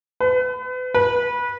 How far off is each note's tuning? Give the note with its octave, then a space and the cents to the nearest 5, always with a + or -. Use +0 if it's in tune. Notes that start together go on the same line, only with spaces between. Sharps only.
B4 +35
B4 -25